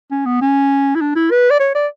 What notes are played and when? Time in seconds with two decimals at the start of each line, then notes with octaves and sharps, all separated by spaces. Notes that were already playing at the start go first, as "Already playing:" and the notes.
0.11 C#4
0.26 B3
0.42 C#4
0.95 E4
1.01 D4
1.16 E4
1.31 B4
1.50 D5
1.60 C#5
1.75 D5